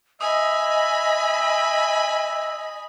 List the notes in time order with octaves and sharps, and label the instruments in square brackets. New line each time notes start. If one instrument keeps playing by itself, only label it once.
[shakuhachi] D#5 [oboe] E5 [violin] G#5 B5 [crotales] D#6